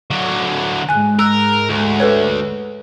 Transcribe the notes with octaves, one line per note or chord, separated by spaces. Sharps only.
D3 F#3
G#2 G#3 G#5 F#6
A#4 E6 F#6
D2
A4 B4 C#5